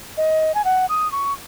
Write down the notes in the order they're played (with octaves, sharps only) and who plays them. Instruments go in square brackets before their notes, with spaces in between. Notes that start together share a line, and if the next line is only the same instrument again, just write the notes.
[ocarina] D#5
G#5
F#5
D#6
C#6